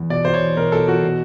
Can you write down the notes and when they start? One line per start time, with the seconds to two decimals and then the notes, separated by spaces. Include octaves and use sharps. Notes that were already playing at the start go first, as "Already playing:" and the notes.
Already playing: E2
0.10 B2 D5
0.25 B2 C5
0.34 C#5
0.41 E2
0.56 B2 A#4
0.72 B2 A4
0.88 E2 F#4
1.04 B2